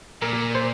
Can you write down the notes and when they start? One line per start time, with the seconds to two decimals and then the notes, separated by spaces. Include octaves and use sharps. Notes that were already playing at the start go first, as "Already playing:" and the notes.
0.22 A#2 A#4
0.55 C5